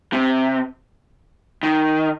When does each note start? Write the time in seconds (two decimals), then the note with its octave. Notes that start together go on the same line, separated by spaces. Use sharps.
0.13 C3
1.63 D#3